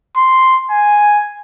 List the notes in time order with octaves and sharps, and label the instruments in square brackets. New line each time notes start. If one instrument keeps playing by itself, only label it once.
[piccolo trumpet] C6
G#5